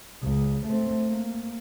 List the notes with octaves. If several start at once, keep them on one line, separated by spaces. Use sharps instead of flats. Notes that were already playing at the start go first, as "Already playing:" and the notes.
C#2
A3 C4
A#3